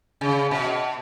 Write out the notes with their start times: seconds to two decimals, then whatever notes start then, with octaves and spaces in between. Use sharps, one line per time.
0.21 C#3
0.51 B2